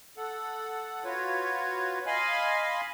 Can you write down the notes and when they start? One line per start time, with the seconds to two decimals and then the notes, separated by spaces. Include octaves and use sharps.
0.17 A4 F#5
1.05 F4 F#4 B4 C#5
2.06 D#5 F5 G#5 B5 C6